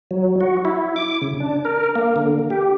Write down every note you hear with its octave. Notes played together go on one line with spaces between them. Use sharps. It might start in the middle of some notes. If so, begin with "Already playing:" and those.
F#3
F#4
E4
D6
C#3
D4
A#4
A#3
D3
G4